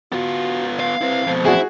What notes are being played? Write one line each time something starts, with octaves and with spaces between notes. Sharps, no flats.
B3 F4 F#4
F5
C4 E4 B4
F2 B2 C5
E4 F#4 G#4